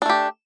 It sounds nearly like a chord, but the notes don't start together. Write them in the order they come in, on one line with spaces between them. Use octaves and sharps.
D4 A3 G4